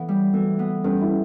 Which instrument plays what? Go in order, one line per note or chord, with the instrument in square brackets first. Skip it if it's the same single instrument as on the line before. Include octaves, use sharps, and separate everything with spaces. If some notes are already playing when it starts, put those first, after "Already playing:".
Already playing: [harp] E3 B3 [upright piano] A3
[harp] G3
[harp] E3 [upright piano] F#3 A3
[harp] B3
[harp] G2 [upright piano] A3 C#4
[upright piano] C#4 E4